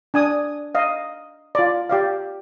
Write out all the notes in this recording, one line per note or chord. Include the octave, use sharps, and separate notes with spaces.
D4 G#5 D#6
D#5 F5
F4 D5
G4 D5 F5